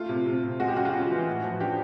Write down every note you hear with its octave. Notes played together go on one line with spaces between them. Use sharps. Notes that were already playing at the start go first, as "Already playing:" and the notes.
Already playing: A3 F4
C3
C3
C3
G#3 F#4
G4
C#3 F#4
F4
C#3 F#4
E3
A2
F3
D4 G4